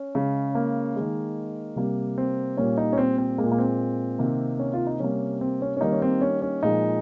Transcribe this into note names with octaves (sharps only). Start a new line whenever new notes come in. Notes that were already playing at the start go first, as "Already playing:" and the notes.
Already playing: C#4
C#3 G#3
A#3
D#3 G#3
C3 G3 A#3
C4
A#2 G3 A#3 C#4
D#4
C#4
C4
C4
G#3 A#3
A#2
A#3
C4
C3 D#3 A#3
C#4
F4
D#4
C3 G3 A#3 C#4
C4
C#4
C#4
D#3 G3 A#3 D#4
C#4
C4
C#4
C#4
A#2 F3 G#3 D#4